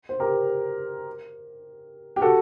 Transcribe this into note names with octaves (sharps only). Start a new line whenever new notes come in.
C5
G4 A#4
G4
F#4 A4